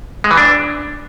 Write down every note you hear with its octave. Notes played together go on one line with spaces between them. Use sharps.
G#3
E3
D4